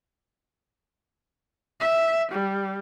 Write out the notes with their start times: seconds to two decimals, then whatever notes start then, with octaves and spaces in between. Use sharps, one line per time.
1.81 E5
2.31 G3